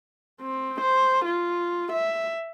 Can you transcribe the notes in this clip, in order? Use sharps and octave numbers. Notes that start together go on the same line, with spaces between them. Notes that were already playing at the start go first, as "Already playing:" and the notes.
C4
C5
F4
E5